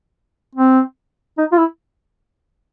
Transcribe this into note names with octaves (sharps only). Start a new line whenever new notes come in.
C4
D#4
F4
E4